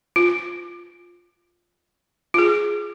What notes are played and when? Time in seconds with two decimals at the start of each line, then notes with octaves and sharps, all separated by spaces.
0.16 F4
2.34 F4 G#4